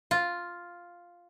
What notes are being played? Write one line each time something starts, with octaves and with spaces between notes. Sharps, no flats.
F4